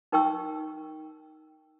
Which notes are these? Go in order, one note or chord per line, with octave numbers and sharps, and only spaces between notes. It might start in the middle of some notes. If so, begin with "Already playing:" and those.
D#4 A#4 G5 C#6 E6